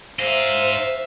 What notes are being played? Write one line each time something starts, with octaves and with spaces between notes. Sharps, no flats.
D#4 G#4 C5 E5 F5